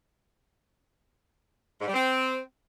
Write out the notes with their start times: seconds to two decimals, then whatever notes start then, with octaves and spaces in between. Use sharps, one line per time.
1.81 G#2
1.88 G3
1.94 C4